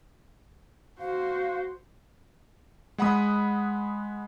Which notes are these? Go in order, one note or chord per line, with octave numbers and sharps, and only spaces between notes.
F#4 C5 F5
G#3 F#5 B5 D#6